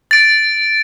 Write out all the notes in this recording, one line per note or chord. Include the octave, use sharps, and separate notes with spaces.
A6 D7